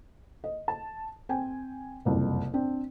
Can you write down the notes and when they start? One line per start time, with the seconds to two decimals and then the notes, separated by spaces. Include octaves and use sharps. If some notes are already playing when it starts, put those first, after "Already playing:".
0.44 D#5
0.68 A5
1.29 C4 G5 G#5
2.05 F#1 C2 F2
2.54 C4 D4